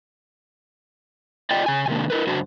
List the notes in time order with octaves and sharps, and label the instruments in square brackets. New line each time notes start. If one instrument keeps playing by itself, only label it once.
[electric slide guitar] F4 D5 D#5 G5
C#3 G#5
C3 D#3 G#3 A#3 D4
E4 A#4 B4
F#2 C#3 D4 F#4 C5